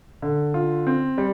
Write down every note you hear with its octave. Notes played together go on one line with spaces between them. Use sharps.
D3
F4
C4
G3